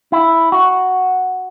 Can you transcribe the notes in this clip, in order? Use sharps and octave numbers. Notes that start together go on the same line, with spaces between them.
E4
F#4